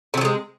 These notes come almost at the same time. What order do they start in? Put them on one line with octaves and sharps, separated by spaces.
C3 F#3 F3 G#3